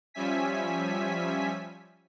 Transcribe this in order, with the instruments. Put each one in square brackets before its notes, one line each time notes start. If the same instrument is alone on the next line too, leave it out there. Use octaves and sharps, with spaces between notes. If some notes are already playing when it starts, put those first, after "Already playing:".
[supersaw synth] F3 G3 C#4 E5 G#5 B6